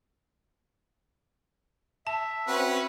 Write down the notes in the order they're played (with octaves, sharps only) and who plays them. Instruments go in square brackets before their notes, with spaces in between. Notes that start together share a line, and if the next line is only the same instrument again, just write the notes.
[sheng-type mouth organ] E5 [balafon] A5
[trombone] C4 [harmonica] C#4 F#4 B4